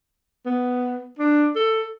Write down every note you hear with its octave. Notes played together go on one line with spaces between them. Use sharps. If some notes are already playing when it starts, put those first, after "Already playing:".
B3
D4
A4